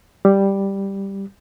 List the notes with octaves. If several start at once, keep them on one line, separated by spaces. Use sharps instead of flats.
G3